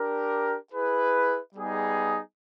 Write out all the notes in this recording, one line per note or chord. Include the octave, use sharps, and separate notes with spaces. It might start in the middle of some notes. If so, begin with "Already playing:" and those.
Already playing: D4 G4 A#4
E4 G#4 B4
G3 B3 D#4 G#4